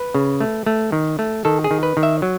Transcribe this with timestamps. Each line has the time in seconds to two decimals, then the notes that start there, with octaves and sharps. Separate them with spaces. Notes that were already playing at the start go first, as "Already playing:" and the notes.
Already playing: B4
0.15 C#3
0.41 A3
0.66 A3
0.92 D#3
1.19 A3
1.45 D#3 A4
1.64 G#4
1.71 D#3
1.83 B4
1.97 D#3
2.03 E5
2.22 F#3